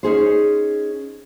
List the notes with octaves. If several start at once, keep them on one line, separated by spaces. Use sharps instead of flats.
C#4 D#4 G#4 C5